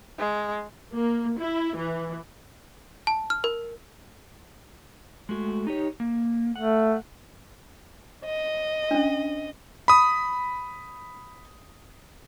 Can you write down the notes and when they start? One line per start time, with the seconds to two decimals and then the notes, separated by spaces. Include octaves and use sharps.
0.19 G#3
0.94 A#3
1.39 E4
1.77 E3
3.07 A5
3.30 F6
3.44 A#4
5.29 G#3 A3 F#4
5.67 D#4 G4 C#5
6.00 A#3
6.56 A3 F#5
8.26 D#5
8.91 C#4 D4
9.88 B5 D#6